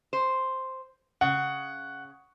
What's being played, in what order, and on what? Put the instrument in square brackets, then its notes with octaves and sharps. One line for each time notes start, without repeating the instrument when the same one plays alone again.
[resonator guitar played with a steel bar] C5
[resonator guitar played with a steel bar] C#3 [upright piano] F#5